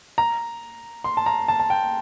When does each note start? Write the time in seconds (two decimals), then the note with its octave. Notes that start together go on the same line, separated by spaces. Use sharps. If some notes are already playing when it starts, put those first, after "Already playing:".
0.18 A#5
1.04 C6
1.17 A5
1.26 A#5
1.48 A5
1.60 A5
1.70 G5